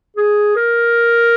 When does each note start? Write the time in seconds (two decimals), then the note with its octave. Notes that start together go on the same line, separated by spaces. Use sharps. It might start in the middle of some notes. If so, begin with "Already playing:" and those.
0.17 G#4
0.56 A#4